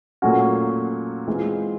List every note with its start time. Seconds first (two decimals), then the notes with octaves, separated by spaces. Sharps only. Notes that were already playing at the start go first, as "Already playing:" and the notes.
0.22 A#2 F#3 A3 C#4 F#4
1.28 E3 G#3 C4 F4 G#4